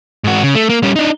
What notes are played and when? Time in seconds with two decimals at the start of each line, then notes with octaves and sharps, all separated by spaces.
0.24 G#2 F#4
0.43 C#3
0.55 A3
0.69 A#3
0.83 G3 C#4
0.96 D4 D#4